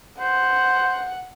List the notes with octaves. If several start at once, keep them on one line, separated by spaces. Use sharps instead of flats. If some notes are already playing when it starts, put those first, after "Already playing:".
C5 F#5